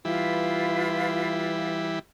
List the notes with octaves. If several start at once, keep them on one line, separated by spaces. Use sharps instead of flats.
E3 G3 E4 F4 B4